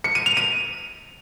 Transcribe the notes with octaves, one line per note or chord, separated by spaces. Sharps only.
C#7
D#7
F7
D#7